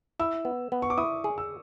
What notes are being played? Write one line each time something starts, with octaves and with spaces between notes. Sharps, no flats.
E4 E6
B3
B3
C#6
D6
E4 D#6
G#4
E6